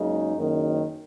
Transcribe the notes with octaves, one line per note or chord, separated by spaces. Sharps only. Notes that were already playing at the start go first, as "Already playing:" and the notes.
Already playing: F#1 F#2 C#3 G#3 D#4
F#1 F#2 D#3